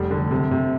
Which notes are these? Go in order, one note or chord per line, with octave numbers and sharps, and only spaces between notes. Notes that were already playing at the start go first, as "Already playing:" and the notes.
Already playing: F1 G3
D3
C3
C3